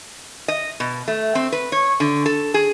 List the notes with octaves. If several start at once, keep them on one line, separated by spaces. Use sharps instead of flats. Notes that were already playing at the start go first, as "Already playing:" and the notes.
D#5
B2
A3
C4
B4
C#5
D3
A4
G#4